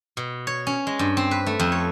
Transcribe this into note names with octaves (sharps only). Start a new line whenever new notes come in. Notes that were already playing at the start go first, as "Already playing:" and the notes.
B2
C#5
C#4
G#3
G2
C4
B4
A3
F2
C#5